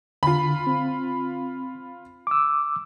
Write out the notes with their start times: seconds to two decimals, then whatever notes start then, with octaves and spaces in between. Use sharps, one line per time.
0.23 D3 F4 B5
0.67 C4
2.27 D6 E6